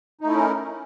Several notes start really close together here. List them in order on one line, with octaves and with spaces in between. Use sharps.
D#4 A3 E4 C#4 A#4